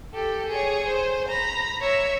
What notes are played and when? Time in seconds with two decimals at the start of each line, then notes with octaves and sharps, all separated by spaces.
0.13 G4 A4
0.49 G#4 C#5
0.87 C5
1.28 A#5 B5
1.81 C#5 E5